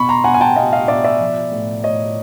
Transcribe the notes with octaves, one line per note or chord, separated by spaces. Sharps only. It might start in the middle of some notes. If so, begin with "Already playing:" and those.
Already playing: B2 B5 C#6
A#5 C6
B2 F#5 G#5
G#5
G5 A5
B2 D#5 F5
D#5 F5
B2 D5 E5
D5 E5
F3
A2
A2 C#5 D#5